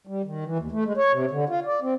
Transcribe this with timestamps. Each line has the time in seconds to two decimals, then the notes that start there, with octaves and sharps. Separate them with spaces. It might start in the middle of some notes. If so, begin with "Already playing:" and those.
0.07 G3
0.25 D#3
0.44 E3
0.59 D#2
0.72 A3
0.85 G#3
0.97 C#5
1.13 C3
1.31 D3
1.49 F4
1.66 D5
1.82 C4